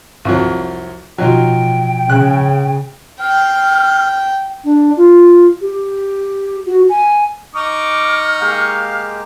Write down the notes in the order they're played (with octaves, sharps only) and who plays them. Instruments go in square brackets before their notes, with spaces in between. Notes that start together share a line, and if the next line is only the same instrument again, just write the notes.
[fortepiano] C2 F2 F#3
[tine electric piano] B2 F3 [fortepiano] F#3 D#4 F4 [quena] G5
[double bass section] C#3 [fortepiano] F#6
[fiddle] G5 [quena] F6
[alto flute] D4
F4
G4
F#4
G#5
[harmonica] D#4 C#6 [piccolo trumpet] D6 [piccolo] F6
[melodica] G#3 A#3 G4 [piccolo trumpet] F5